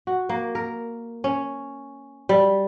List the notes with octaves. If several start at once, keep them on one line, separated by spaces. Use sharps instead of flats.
F#4
A#3
A#4
C#4
G3